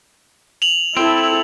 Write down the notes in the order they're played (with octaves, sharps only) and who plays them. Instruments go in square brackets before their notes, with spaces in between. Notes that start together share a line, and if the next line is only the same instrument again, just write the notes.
[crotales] F7 F#7
[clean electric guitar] C4 [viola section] E4 A4